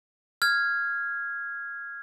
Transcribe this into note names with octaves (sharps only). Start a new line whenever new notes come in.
F6 G#6